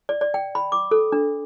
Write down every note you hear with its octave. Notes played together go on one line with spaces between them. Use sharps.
D5
D5
G5
B5
D6
A4
D4